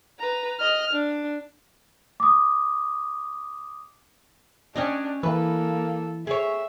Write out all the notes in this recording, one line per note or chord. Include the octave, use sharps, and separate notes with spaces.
B4 A#5
D#5 F6
D4
D6 D#6
C#4 D4 G4 D#5
E3 A#3 A4 B4
G#4 C#5 E5